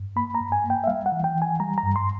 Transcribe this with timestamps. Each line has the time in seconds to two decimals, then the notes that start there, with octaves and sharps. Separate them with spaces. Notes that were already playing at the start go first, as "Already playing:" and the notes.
Already playing: G2
0.16 A#3 B5
0.35 A#5
0.41 G2
0.52 G#5
0.64 A#3
0.70 G5
0.84 E5
0.87 G3 F5
1.06 F#5
1.12 E3
1.24 G5
1.35 E3
1.42 G#5
1.60 G3 A#5
1.78 A#5
1.83 G2
1.96 C6